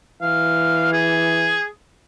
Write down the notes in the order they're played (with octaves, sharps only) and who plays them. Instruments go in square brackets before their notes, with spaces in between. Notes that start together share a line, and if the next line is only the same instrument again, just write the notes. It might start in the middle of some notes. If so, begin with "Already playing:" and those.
[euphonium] E3 [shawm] F5
[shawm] G#4